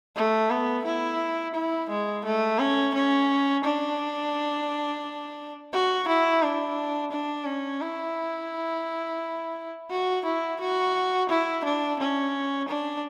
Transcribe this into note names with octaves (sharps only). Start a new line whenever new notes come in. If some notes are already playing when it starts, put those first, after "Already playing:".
A3
B3
E4
E4
G#3
A3
C#4
C#4
D4
F#4
E4
D4
D4
C#4
E4
F#4
E4
F#4
E4
D4
C#4
D4